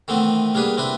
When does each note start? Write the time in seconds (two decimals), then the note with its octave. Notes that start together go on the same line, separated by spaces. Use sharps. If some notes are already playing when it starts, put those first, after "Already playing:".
0.08 D#3 E3 A3 B3 C4
0.54 G3 A#3 D4 G#4 B4
0.77 C4 D4 E4 B4